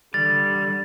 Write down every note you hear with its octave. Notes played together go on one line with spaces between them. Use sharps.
D3 G3 A6